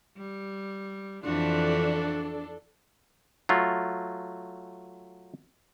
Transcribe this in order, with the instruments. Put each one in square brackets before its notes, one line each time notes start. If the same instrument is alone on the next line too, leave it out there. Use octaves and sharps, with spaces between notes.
[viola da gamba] G3
[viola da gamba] F2 E3 F#4 [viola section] D4 A4
[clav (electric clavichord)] F#3 A3 F4